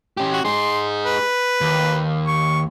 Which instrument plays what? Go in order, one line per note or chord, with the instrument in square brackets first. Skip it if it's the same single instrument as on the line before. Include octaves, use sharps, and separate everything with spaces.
[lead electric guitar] C#4 G4
[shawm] F#4
[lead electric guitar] D#4 G#4 [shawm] C6
[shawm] B4
[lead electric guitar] D#2
[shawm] C#6